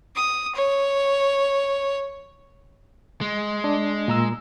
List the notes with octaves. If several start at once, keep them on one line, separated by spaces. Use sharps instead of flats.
D#6
C#5
G#3
D4
A#2 A#5 E6